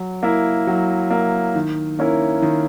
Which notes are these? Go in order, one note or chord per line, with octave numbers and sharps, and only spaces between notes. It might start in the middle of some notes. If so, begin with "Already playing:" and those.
Already playing: F#3
A#3 E4
F#3
A#3 E4
D#3
A#3 C#4 E4 A#4
D#3